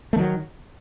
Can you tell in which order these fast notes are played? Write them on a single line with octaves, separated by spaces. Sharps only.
A3 D#3 F#3